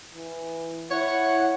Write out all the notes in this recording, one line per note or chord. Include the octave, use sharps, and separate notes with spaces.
E3
E4 C#5 F#5